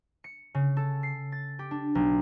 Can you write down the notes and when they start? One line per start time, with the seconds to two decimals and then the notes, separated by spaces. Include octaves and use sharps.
0.24 C#7
0.54 C#3
0.77 A4
1.03 C7
1.32 A6
1.59 G4
1.71 D4
1.95 B1